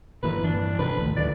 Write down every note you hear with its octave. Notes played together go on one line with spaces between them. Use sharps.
G1 A#2 E3 B4
G2 E3 D4
C3 F3 D4 B4
A#1 D#2 A2
D2 D3 F3 D5